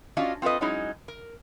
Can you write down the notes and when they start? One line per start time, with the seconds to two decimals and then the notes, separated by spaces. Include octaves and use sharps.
0.17 C#4 D4 F4 F#4 D#5
0.42 C4 F4 A4 B4 D#5
0.61 F#3 G#3 C#4 D#4 E4 G#4
1.08 A#4